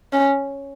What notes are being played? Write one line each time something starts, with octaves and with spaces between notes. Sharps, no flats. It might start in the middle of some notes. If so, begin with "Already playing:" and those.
C#4